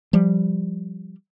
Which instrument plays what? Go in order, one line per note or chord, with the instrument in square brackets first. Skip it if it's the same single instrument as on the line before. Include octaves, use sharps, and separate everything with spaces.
[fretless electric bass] F3 G3